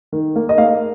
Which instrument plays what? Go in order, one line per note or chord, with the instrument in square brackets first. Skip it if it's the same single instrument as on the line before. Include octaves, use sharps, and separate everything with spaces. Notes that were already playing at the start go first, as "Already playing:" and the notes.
[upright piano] D#3
A#3
D#5
A#3 F5